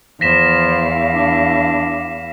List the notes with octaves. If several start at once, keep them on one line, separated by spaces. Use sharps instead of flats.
E2 F3 F5 A#6 B6 E7
D4